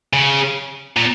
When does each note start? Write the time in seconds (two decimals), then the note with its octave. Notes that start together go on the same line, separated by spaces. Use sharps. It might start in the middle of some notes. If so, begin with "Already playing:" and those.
0.13 C#3
0.97 A#2